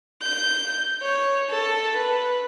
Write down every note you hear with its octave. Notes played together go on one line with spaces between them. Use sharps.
G6
C#5
A4
B4